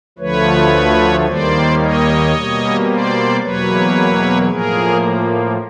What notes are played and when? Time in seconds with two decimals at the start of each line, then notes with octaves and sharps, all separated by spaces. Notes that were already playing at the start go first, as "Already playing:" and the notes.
0.19 D2 D3 F3 A3 B4 C#5
1.26 D#2 D#3 G3 A#3 C5 D5
1.80 C#5 D#5
2.34 B2 G3 A#3
2.88 C5 D5
3.41 E2 B2 F#3 A#3 B4 C#5
4.48 A2 F3 A#3 G#4 A#4